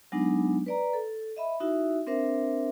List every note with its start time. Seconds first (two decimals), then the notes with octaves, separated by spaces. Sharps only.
0.12 F#3 G#3 B3 D4 D#4
0.66 B4 D5 A#5
0.93 A4
1.36 D#5 E5 B5
1.60 D#4 E4 F#4 E5
2.07 C4 D4 A#4 C5 E5